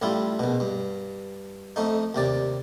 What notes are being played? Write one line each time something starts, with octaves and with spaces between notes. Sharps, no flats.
A1 G3 E4 F4
A#1 B2
G2
F2 A3 D#4
D#2 C3 D5